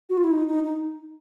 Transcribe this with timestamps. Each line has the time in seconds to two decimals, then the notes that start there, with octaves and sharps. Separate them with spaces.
0.10 F#4
0.17 F4
0.24 E4
0.31 D#4
0.47 D#4
0.64 D#4